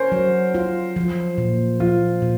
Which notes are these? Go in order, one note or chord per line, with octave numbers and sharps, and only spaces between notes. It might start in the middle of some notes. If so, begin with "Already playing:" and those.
Already playing: C#4 A#4 C5
F#3
F4
F3
A#2
F3 F4
A#2